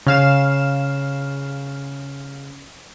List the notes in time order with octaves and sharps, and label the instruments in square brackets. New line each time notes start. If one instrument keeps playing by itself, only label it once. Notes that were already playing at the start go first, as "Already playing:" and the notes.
[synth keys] C#3 F5 E7